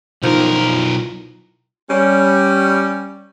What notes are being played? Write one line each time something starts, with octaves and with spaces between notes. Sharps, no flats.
B1 D#3 F3 E4 F4 A#4
G3 C#4